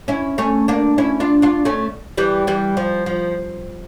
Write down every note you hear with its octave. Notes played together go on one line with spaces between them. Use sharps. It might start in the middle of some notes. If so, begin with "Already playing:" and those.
C#4 E4
A3 C#4
A#3 D4
C#4 E4
D4 F4
D4 F4
A3 C#4
E3 G3
E3 G3
F3
F3